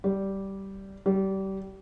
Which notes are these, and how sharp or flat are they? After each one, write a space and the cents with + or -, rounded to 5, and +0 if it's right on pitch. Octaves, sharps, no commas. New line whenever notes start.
G3 -10
G3 -25